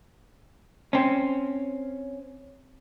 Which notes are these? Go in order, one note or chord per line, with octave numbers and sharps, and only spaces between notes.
C4 C#4